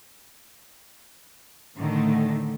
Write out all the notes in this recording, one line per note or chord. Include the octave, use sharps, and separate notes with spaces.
A2 D3 D#3 A3